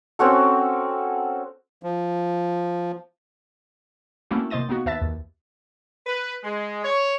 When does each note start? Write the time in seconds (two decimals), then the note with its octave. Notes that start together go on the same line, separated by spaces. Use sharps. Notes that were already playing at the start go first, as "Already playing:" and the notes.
0.19 C4 C#4 F#4 A4
1.83 F3
4.31 A3 A#3 C4 C#4 E4 F#4
4.50 C3 A#3 C5 D#5 A6 D#7
4.69 A#3 B3 D#4 F#4
4.86 D#2 B4 E5 A5 A6
5.02 D#2
6.06 B4
6.44 G#3
6.85 C#5